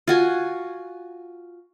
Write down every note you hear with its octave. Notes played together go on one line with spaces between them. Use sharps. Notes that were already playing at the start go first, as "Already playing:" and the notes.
F4 F#4 G#5